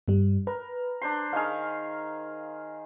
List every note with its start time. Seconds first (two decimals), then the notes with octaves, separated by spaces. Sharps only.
0.08 G2 G3
0.47 A#4 B4
1.02 D4 C5 C6
1.33 D#3 G#4 F5 F6